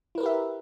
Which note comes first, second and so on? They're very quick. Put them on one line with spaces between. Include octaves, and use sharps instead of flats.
E4 A#4 B4 G4 E5